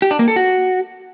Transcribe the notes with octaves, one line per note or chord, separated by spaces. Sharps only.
G4
D4
A#3
A4
F#4